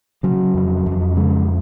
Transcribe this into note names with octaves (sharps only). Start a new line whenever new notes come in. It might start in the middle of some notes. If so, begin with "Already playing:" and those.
C#3 F#3
F2
F2
C#3 G#3